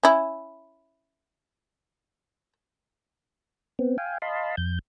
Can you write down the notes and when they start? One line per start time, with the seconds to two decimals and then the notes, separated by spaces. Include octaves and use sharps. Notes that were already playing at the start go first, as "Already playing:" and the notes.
0.03 C#4 E4
3.79 B3 C4
3.98 F5 G5 G#5
4.22 D#5 F5 A5 B5 C6
4.57 F2 G6